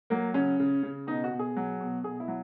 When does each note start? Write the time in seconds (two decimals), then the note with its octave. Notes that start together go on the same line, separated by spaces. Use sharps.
0.10 F#3 A#3
0.34 C#3 C#4
0.60 C#3
0.83 C#3
1.07 B2 D#4
1.24 F#4
1.31 B2
1.39 G#4
1.56 F#3
1.81 B2
2.04 B2 G#4
2.20 E4
2.28 F#3